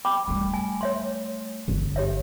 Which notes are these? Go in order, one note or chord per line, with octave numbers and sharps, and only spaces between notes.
G5 B5 D6
G3 A3
G#5
C#5 E5 C6
G1
G4 C#5 E5